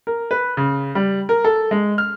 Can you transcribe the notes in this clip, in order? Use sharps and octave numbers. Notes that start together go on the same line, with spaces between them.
A#4
B4
C#3
G3
A#4
A4
G#3
F6